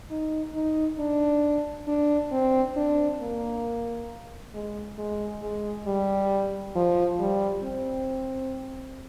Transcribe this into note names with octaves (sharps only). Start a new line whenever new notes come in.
D#4
D#4
D4
D4
C4
D4
A#3
G#3
G#3
G#3
G3
F3
G3
C4